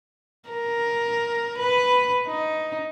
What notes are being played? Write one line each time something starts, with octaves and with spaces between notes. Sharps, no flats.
A#4
B4
D#4